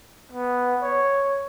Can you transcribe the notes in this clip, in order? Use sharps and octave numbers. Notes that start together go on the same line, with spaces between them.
B3
C#5